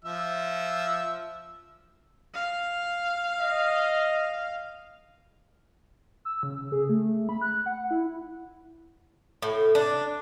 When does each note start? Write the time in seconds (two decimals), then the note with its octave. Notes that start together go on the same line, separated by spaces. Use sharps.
0.05 F3 E5 E6
2.34 F5
3.40 D#5
6.25 E6
6.43 C#3
6.72 G#4
6.89 A3
7.29 B5
7.41 F#6
7.66 F#5
7.91 E4
9.42 A2
9.75 D4